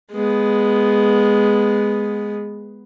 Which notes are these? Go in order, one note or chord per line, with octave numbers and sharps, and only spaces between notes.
G#3 B3